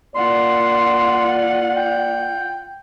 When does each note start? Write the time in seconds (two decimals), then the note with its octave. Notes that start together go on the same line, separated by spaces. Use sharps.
0.16 A#3 F4 D5 F#5 C6
1.77 G5